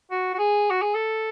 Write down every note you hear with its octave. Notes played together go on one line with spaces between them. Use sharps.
F#4
F#4
G#4
F#4
G#4
A4